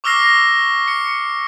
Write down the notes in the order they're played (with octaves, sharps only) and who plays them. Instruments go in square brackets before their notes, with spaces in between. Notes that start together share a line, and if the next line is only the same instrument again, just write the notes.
[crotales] C#6 D6 E6 F6 A#6 C7
C#7